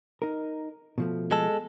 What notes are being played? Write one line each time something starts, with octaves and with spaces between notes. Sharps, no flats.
D#4 A#4
B2 F3 A3
G#3 A4